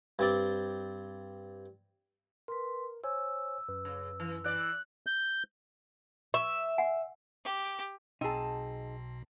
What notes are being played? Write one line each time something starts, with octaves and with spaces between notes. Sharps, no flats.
G2 C4 D5
A#4 B4 C6
C5 C#5 G#5 E6
F#2 B4
C#3
E3
E3 D5 F#6
G6
E5 C#6
F#5 G#5
G4
B1 B2 C4 D#4 G#4 A5